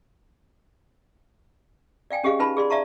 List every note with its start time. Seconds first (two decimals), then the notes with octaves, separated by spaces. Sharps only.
2.11 D5 F5 G5 G#5
2.24 C#4 G4 G#4 D#5 F5
2.39 C#4 D#4 F4 B4 A5 B5
2.57 G#4 D5 C6
2.70 D5 E5 F5 A5 A#5 C#6